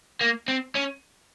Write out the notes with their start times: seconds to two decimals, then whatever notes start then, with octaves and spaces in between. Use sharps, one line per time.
0.21 A#3
0.48 C4
0.75 C#4